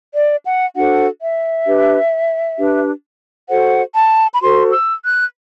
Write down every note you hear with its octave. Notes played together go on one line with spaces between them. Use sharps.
D5
F#5
D4 F#4 A4 C5 F#5
E5
D4 G4 B4
D4 G4 B4
F#4 A4 C5 F#5
A5
B5
F#4 A4 C5 C6
E6
F#6